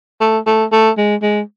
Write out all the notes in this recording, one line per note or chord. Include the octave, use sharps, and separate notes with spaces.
A3
A3
A3
G#3
G#3